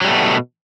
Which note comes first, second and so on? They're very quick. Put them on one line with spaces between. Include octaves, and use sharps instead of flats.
F#3 G3 A3 B2